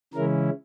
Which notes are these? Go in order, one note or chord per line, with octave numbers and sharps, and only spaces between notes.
C#3 E3 G#3 C#4 E4 A#4